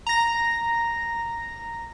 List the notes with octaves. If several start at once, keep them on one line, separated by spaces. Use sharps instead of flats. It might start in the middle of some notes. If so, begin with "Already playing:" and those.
A#5 A#6